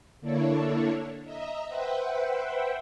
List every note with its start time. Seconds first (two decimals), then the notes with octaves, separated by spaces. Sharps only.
0.21 D3 A#3 D4 E4 A4 C#5
1.25 D#5 E5 A#5
1.67 B4 C5 E5 F#5 G5